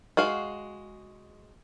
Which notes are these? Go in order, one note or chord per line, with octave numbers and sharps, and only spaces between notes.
G#3 F#4 F5